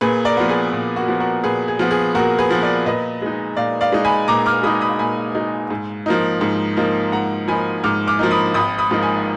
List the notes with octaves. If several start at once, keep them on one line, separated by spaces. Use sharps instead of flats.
A#2 G#4 B4
A#4 D5
F3 B3
G#4 B4
A#2
F#4 A#4
F3 B3
F#4 A#4
A#2 G#4 B4
G#4
F3 B3
G#4
A#2 F#4 A#4
G#4 B4
F3 B3
A#4 D5
A#2 B4 D#5
G#3 D#4
A#2 D5 F5
D5 F5
G#3 D#4
G#5 B5
A#2 A#5 D6
D6 F6
G#3 D#4 B5 D#6
B5 D#6
A#2 G#5 B5
G#3 D#4
G#2
F3 A#3 D#4
G#2
F3 A#3 D#4
G#2 F#5 A#5
F3 A#3 D#4 G#5 B5
G#2 D6 F6
D6 F6
F3 A#3 D#4
B5 D#6
G#1 B5 D#6
B5 D#6
G#2 F3 A#3 D#4
G#5 B5